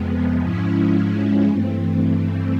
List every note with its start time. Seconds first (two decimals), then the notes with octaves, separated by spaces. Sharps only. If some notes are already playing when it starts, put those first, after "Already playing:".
Already playing: F2 C3 F3 G#3 B3
0.42 G#2 F3 G#3 C#4 E4
1.46 G2 E3 A3 C4